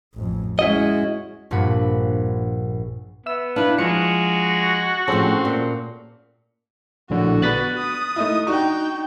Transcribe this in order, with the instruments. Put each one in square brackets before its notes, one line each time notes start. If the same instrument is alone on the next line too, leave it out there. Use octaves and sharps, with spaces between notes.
[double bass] A1 F2
[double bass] G#3 C#4 [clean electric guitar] E4 F#4 D#5
[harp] A#1 G2 A#2 F#5 B5
[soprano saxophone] B3 [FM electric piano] E5 E6
[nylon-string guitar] D4 E4 [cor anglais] B4 [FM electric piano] F5
[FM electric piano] F3 C#7 [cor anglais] G#3 [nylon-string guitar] F4 [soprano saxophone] F#4
[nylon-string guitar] A2 F3 [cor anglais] C4 [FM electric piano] C#4 G#4 A4
[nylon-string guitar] A#2
[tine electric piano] A#1 A2 D3 [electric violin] F#4
[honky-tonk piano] B3 D4 B4 [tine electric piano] F#6 A6 B6
[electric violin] D#6
[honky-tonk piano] A3 D#4 E4
[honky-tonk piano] D4 F#4 C#6 [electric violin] D#4 G5